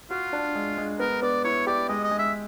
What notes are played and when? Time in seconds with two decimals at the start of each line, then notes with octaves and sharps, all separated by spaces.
0.10 F4 F#4
0.33 D4
0.55 G#3
0.78 G#3
0.99 B3 A#4
1.22 B3 D5
1.44 E4 C#5
1.67 G4 D5
1.89 G#3 D#5
2.04 D#5
2.11 G#3
2.19 E5